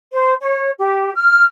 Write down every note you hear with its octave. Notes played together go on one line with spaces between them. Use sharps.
C5
C#5
G4
F6